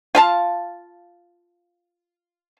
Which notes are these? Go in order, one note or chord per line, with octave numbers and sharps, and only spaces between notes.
F4 F5 A5